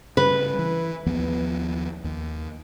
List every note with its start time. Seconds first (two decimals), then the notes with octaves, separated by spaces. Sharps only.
0.17 C#3 G3 B4
0.59 E3
1.06 D#2 F3 B3
2.04 D#2